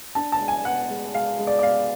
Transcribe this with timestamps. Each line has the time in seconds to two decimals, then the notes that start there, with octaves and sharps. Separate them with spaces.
0.15 D4 A5
0.32 A5
0.40 G#3
0.48 G#5
0.65 B3 F#5
0.90 G#3
1.14 G#3 F5
1.39 G#3
1.47 D5
1.59 D5
1.63 B3 F5